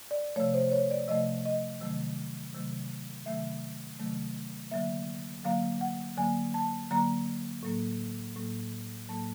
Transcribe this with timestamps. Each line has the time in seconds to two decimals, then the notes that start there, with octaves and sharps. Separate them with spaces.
0.11 D5
0.36 C3 F3 A3 C#5
0.54 C5
0.71 C#5
0.91 D5
1.08 C3 F3 A3 D#5
1.45 D#5
1.81 C3 D#3 F#3 A3
2.54 C3 D#3 F#3 A3
3.26 C3 D#3 F#3 A3 E5
4.00 C3 D#3 F#3 A3
4.71 D3 F#3 A#3 E5
5.44 D3 F#3 A#3 F5
5.81 F#5
6.17 D3 F#3 A#3 G#5
6.54 A5
6.91 D3 F#3 A#3 A#5
7.63 A2 F#3 A#3
8.36 A2 F#3 A#3
9.09 A2 F#3 A#3 A5